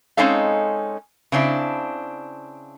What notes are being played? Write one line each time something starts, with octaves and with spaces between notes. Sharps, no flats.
G#3 C4 C#4 D#4 A4 F5
C#3 C4 D4 E4